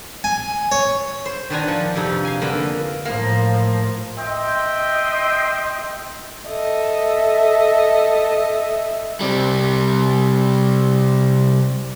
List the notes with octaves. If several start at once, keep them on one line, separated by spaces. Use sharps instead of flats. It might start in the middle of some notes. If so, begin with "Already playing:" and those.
G#5
C#5
C5
D#3 B3 D4 D5 G#5 A#5
F3
F2 C3 D#4
F5 G#5
D3 A#3 B3 A#4
A2 F3 A#3
D#5 E5 G5 C6
A4 D#5 E5
C3 G3